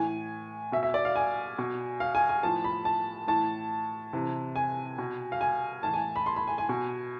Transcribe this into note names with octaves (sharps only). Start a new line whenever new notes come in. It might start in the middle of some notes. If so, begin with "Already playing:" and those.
Already playing: A2 E3 G#5
B2 E5
E5
D5
F5
G#5
B2
F5
G#5
G#5
A2 F3 A5
B5
A5
A2 E3 A5
C3 E3
G#5
B2
F5
G#5
A2 E3 A5
G#5
B5
C6
B5
G#5
G#5
B2